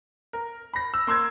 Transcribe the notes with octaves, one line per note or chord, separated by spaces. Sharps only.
A#4
B5 A#6
E6
A#3 C6 E6 G#6